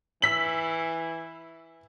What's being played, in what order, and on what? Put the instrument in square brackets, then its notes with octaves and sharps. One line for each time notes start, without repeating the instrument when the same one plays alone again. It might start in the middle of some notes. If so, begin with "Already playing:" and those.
[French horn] E3 [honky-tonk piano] E6 B6 F#7